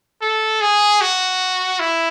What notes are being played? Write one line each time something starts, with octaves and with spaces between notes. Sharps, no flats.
A4
G#4
F#4
E4